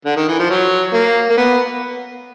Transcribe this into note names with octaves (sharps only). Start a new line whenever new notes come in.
D3
D#3
E3
F3
F#3
A#3
A#3
B3